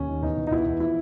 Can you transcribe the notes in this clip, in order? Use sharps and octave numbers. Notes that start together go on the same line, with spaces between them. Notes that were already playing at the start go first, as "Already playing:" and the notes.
Already playing: D#2 C#4
D#3
E2 D#4
E2
D#4
E2 E4
E2
F3 E4